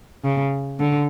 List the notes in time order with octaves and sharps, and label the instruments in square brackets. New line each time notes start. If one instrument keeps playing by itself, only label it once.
[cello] C#3
D3